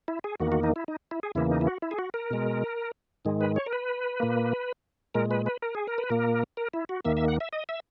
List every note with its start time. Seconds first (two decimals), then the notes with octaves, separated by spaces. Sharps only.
0.08 E4
0.24 G#4
0.40 E2 D#3 A#3 F#4
0.52 F#4
0.63 D#4
0.76 E4
0.88 D#4
1.11 E4
1.23 G#4
1.35 E2 C#3 E3 A#3 E4
1.51 D#4
1.61 E4
1.67 F#4
1.82 E4
1.91 G#4
1.99 F#4
2.14 A#4
2.30 B2 G#3
3.25 G#2 D#3 G#3
3.41 B4
3.56 C#5
3.66 A#4
3.73 B4
4.20 A#2 A#3
5.14 A#2 G#3 A#4
5.31 B4
5.46 B4
5.62 A#4
5.75 G#4
5.88 A#4
5.98 B4
6.10 A#2 A#3 A#4
6.57 A#4
6.74 E4
6.89 F#4
7.05 D#2 D#3 A#3 E5
7.17 E5
7.28 F#5
7.40 E5
7.53 D#5
7.69 E5